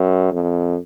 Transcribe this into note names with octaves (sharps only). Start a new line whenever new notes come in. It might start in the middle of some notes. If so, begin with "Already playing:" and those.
Already playing: F#2
F2